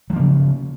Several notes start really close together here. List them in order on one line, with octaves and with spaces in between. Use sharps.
F#3 F3 A#3 C#3